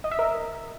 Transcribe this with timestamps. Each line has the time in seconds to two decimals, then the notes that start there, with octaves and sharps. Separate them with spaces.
0.04 D#5
0.11 E5
0.19 A#4